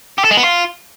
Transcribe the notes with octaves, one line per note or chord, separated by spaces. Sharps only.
G4
A4
G#3
B3
F4